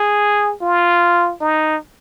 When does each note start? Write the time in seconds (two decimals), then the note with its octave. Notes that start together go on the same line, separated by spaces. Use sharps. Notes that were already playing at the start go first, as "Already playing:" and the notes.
Already playing: G#4
0.62 F4
1.41 D#4